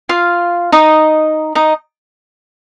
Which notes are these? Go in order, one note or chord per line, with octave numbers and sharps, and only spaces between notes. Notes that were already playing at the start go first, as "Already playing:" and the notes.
F4 F5
D#4 D#5
D#4 D#5